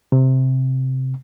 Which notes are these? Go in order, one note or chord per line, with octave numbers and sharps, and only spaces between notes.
C3